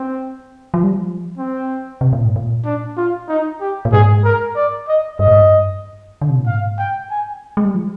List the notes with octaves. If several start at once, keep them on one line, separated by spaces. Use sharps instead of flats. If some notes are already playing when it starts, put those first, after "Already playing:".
Already playing: C4
F3
G3
F3
C4
C3
A#2
G#2
A#2
D4
F4
D#4
G4
A#2
G#2 G#4
A#4
D5
D#5
G2 D#5
G#2
G2
D3
C3
A#2
G#2 F5
G5
G#5
G#3
G3
F3